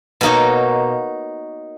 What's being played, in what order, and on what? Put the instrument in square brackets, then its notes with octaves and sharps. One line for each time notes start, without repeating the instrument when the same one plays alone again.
[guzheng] B2 A#3 D#4 F#4 C#5